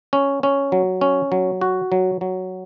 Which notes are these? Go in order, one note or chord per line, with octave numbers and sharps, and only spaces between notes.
C#4
C#4
F#3
C#4
F#3
F#4
F#3
F#3